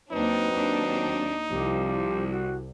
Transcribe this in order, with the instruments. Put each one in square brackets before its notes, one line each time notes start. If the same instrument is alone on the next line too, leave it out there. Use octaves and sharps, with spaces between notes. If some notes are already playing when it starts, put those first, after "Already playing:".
[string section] D#2 D4 [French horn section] F#3 C4 [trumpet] D#4 [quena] B4
[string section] D#2 D4
[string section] C2 [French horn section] F3 [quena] G4
[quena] F#4